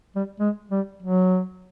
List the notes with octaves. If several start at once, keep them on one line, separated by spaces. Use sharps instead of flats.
G3
G#3
G3
F#3